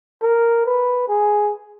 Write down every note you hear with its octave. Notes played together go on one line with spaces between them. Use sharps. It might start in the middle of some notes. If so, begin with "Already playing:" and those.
A#4
B4
G#4